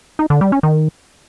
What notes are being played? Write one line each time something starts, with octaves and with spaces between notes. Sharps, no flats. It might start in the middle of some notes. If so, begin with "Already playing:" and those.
D#4
D3
G3
C#4
D#3